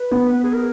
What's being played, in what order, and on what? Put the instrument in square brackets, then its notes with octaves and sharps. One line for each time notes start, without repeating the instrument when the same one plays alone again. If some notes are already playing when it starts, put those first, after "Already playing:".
Already playing: [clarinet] B4
[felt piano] B3
[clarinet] G#4
A#4